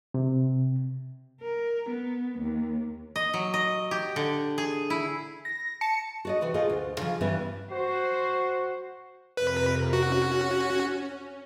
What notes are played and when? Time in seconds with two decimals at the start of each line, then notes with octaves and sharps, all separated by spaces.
0.14 C3
1.41 A#4
1.90 B3
2.39 D#2
3.16 D#5
3.34 F#3
3.54 D#5
3.91 G4
4.16 D3
4.58 G#4
4.90 E4
5.45 A#6
5.81 A5 C#7
6.25 F#4 D5 D#5
6.41 C3 E3 F#4
6.54 A3 F4 G#4 D#5
6.69 D2
6.99 C#3 F3
7.21 G2 E3 G3 B3 C#4 E4
7.71 F#4 C5
9.37 F2 C3 A#4 B4
9.93 C#4 F#4